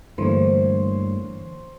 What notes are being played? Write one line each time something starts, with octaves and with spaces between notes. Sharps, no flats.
G2 D3 E3 A3 A#3 C5 C#5